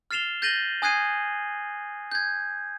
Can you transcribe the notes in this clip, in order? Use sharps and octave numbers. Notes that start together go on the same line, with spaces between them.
F6 A6 C7 E7 F7 G7
G6 A6 A#6 D#7 F#7 G7
G#5 D#6 F#6 G#6 C7 D#7
G6 G#6